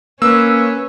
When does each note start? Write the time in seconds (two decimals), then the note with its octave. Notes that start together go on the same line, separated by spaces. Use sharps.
0.22 A#3 C#4 B4 E6